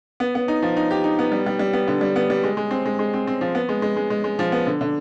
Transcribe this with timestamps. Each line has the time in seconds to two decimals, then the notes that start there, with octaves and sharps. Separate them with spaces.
0.20 B3
0.35 B3
0.48 D#4
0.63 F3
0.77 D#4
0.91 G4
1.04 D#4
1.19 B3
1.32 G3
1.46 G3
1.59 G3
1.73 B3
1.88 D3
2.01 G3
2.16 B3
2.30 G3
2.44 G#3
2.57 G#3
2.71 C4
2.86 G#3
2.99 G#3
3.14 C4
3.27 C4
3.41 F3
3.55 B3
3.69 G#3
3.82 G#3
3.96 G#3
4.10 G#3
4.24 G#3
4.39 F3
4.52 B3
4.67 D3
4.81 D3